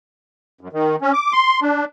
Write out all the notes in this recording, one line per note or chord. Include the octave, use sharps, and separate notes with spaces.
F#2
D#3
C#4
D6
C6
D4